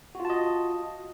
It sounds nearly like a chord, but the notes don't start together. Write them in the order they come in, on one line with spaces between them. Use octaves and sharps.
F#4 F4 A5 D#5